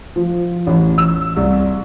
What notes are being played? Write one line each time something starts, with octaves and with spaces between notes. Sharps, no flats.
F3
A1
E6
C2